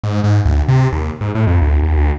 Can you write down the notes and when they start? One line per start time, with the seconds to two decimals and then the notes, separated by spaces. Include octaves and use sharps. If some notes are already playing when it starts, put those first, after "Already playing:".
0.04 G#2
0.24 G#2
0.45 D2
0.68 C3
0.92 D#2
1.21 G#2
1.35 A2
1.47 F2
1.62 D2
1.83 D#2
1.97 D2